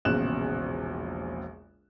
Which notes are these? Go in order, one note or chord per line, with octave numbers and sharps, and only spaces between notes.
E1 A#1 E2 C#3 F#6 E7